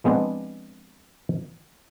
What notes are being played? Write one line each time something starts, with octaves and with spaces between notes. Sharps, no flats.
F3 G#3 B3 C4 D4